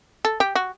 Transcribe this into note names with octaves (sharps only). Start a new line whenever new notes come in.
A4
G4
F#4